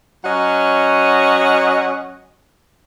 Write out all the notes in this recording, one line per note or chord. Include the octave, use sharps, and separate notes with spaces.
F#3 C#4 D#5 F#5